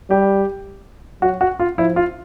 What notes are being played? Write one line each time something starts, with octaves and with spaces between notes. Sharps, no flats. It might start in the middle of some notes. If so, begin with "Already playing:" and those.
G3 G4
F#3 F#4
F#4
F4
F3 E4
F4